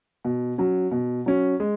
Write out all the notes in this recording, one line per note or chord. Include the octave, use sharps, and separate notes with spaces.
B2
F#3 C#4
B2
F#3 C#4
G#3